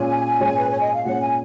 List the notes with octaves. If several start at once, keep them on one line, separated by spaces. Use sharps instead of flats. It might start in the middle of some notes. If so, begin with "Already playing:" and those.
Already playing: A#2 G#3 C#4 G#5
A#2 G#3 C#4
B4
C#5
D#5
F5
A#2 G#3 C#4 F#5
G#5